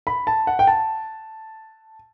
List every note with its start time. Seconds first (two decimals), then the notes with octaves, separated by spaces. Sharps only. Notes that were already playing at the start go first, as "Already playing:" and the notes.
0.07 B5
0.27 A5
0.47 F#5
0.59 G5
0.67 A5